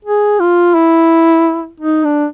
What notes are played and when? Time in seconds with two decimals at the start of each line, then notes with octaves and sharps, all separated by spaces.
0.05 G#4
0.40 F4
0.75 E4
1.80 D#4
2.04 D4